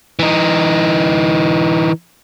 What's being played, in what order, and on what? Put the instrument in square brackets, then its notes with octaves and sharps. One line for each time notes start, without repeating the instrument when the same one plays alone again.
[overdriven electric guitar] E3 D#4